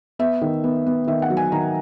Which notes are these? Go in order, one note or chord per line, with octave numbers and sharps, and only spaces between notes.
B3 E5
D#3
B3
B3
D#3 E5
F#5
F#3
G#5
D#3 A#5